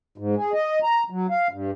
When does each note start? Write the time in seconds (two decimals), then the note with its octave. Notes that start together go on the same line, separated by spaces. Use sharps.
0.18 G#2
0.36 G#4
0.53 D#5
0.83 A#5
1.10 F#3
1.30 F5
1.51 G2